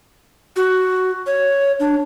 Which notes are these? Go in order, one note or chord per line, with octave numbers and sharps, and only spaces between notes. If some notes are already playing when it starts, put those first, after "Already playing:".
F#4
C#5
D4